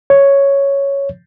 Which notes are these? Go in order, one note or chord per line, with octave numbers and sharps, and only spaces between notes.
C#5